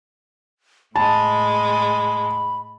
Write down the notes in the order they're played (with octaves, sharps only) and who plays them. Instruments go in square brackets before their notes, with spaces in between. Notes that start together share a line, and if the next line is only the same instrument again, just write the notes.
[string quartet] A2 G#3 [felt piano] A5 [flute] B5